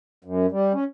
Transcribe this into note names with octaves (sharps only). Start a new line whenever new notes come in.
F#2
G3
C#4